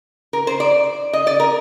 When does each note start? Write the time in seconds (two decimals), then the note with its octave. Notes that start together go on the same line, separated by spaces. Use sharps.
0.33 A#4
0.47 C5
0.60 D5
1.13 D#5
1.27 D5
1.40 A#4